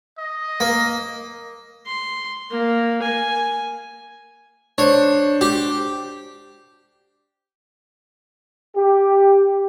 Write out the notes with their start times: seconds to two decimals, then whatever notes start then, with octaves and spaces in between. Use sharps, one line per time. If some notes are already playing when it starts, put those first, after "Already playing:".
0.18 D#5
0.60 A#3
1.86 C6
2.51 A#3
3.02 G#5
4.78 D4 C5 C#5
5.41 G4
8.75 G4